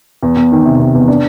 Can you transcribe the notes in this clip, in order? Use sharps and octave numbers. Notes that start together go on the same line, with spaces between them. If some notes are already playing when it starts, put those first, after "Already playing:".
E2
E2
D#3
C3
C3
E2
D4